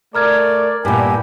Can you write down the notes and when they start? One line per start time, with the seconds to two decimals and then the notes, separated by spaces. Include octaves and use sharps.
0.15 A3 A#4 D5 A#5 F6 G#6
0.85 G2 A#2 B3 E4 G4 G#5